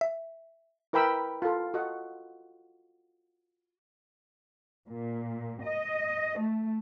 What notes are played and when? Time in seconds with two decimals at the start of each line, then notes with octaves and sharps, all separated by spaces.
0.01 E5
0.93 E4 A#4 B4 G5 B5 E6
1.42 F4 A4
1.74 F#4 A4 D#5 F#5
4.87 A#2
5.62 D#5
6.40 A3